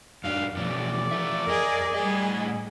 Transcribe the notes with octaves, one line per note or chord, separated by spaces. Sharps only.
F#2 D4 F5
B2 E3 F3 C#4 D5
F3 A4 E5
F2 G#4 A#4 D#5
A2 G3 G#4 D#5